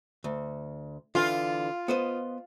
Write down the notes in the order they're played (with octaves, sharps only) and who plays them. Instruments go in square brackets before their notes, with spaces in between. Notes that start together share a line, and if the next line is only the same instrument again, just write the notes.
[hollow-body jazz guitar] D2
[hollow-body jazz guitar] D3 E3 [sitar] F4
[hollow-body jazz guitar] B3 C5 D#5